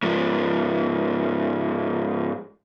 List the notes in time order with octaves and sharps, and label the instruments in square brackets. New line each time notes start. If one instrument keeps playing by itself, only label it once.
[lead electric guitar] G#2 F3